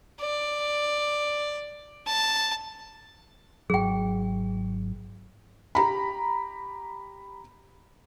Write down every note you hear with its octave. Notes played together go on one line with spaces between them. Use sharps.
D5
A5
G#1 F#3 G#4 G5
G4 A#5 B5